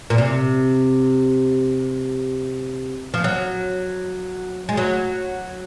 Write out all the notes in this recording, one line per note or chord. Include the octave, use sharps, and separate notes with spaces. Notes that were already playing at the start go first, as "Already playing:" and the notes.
A#2
C3
F3
F#3
G#3
F#3